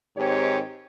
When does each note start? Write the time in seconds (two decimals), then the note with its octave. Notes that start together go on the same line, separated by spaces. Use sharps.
0.17 G#2 D#3 C4 G4 C#5